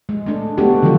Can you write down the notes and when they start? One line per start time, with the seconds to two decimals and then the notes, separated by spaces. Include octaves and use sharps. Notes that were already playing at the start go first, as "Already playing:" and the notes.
0.09 G#3
0.26 A3 D4
0.57 G#3 A3 B3 D4 F#4 G4
0.83 D3 D#3 F3 F#3 F4 A4